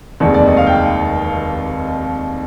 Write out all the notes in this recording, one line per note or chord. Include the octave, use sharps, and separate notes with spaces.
F1 D#2 D#3 G#3 D5
D5
D#5
F5
G5